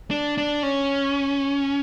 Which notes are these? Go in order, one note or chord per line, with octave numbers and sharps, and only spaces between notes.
D4
D4
C#4